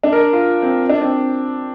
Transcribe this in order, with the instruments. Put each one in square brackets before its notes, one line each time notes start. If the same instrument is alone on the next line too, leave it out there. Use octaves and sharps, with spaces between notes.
[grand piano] D4
A#4
F4
C4
D4
C4